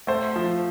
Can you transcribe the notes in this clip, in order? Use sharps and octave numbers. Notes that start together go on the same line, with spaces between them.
A3 C5
F3